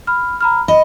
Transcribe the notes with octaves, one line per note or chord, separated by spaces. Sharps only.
B5 F6
A#5 B5 F6
D#5 B5